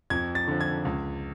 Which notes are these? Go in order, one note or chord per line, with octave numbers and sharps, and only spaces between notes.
F2 G#6
A6
D3 F3
G#6
C#2